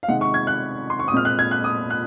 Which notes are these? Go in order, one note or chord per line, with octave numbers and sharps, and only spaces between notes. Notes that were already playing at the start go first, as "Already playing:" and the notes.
F5
C3 D#3 G#3 F#5
C#6
G#6
F#6
C6
C#6
D#6
A#2 G#3 C4 F6
F#6
G#6
F#6
D#6
F#6